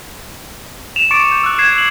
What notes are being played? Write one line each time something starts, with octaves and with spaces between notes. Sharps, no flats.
E7 F7
C#6 D6 A6 C#7 D7
G6
E6 F#6
G#6 C7 E7
G#6 F#7